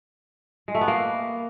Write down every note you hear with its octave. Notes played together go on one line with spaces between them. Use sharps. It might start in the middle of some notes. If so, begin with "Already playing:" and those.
G#3
A3
B3
A#3